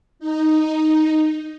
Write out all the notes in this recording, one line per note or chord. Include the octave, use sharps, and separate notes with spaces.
D#4